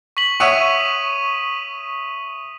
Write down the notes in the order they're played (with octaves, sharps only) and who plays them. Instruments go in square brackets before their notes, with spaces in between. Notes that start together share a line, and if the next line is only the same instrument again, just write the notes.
[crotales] C#6 B6 F#7
[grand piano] C#5 E5 F#5 [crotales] C#6 D#6 D#7